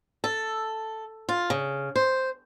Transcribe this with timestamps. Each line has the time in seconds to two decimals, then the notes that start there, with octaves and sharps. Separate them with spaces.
0.24 A4
1.29 F4
1.50 C#3
1.96 C5